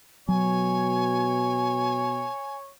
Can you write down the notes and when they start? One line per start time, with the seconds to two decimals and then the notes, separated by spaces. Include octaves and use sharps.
0.29 B2 F#3 C#5 G#5